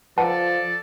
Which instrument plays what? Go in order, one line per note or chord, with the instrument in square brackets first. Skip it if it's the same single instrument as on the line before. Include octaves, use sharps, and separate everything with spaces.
[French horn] F3 [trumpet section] A4 D5 [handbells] B4 F#5 [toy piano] A5